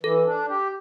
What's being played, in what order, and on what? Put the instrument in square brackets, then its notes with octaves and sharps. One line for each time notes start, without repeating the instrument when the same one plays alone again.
[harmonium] E3 [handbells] A4
[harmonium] D4
G4